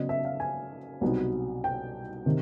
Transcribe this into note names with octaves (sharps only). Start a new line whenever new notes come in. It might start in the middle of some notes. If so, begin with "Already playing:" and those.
Already playing: C#3 F#3 B3 D5 D#5
E5
F5
G#5
C2 B2 F#3 B3 D#4
G5
C3 D#3